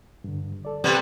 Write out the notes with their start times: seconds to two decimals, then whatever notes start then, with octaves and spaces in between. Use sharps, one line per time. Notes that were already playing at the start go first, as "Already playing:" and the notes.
0.24 G2 D3
0.65 A4 D5
0.84 C3 G3 B3